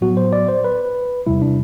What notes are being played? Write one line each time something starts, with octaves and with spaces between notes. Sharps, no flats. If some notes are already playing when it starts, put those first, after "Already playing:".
A2 F#3 B3 F#4
C5
D5
C5
B4
E2 C3 G3 E4
D4